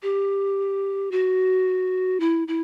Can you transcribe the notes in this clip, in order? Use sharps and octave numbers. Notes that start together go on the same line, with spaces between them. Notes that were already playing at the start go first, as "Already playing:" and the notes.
G4
F#4
E4
E4